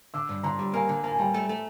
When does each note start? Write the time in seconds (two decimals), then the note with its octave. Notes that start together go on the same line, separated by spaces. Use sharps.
0.14 D3 D6 E6
0.29 G2
0.43 D3 A#5 C6
0.59 G3
0.74 A#3 G#5 A#5
0.89 D3
1.04 A#3 A5
1.12 G#5
1.19 G3 G5 A5
1.34 A3
1.49 A3